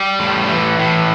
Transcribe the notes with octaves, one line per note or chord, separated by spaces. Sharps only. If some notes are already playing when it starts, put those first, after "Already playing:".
Already playing: G3
A2
E3
A2